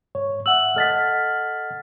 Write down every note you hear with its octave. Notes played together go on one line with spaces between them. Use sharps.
G#2 C#5
E5 F#5 E6 F#7
A4 D#5 F#5 F6 A6 B6